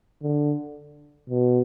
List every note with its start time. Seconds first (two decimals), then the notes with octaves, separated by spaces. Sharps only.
0.22 D3
1.29 B2